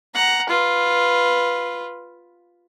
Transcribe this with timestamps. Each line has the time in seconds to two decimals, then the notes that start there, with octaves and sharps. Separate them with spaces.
0.14 F#5 A#5
0.49 F4 B4